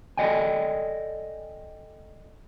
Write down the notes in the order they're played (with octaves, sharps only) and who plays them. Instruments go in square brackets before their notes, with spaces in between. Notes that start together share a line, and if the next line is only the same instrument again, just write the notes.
[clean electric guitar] A4 C5 D5 D#5 G5 G#5